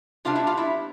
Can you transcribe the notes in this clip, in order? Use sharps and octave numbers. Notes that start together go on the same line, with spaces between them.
C3 G3 B3 D4 F4 F5
E4 E5
F4 F5
E4 E5